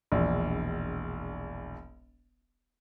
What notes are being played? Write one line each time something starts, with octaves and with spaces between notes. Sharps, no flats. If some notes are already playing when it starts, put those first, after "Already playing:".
E1 A#1